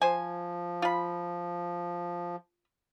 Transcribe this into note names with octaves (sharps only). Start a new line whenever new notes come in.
F3 C5 G#5
F4 B5